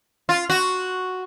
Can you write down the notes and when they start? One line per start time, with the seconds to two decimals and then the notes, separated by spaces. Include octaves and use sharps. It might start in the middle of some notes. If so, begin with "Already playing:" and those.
0.29 F4
0.50 F#4